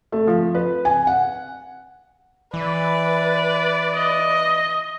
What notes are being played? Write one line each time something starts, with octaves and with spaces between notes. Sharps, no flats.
A3
F3
B4
G#5
F#5
E3 B4 D5
D#5